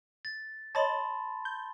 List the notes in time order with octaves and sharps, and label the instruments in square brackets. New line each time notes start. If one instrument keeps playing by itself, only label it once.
[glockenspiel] A6
[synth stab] C#5 D#5 A6 [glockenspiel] A5 B5 C6
[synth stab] G6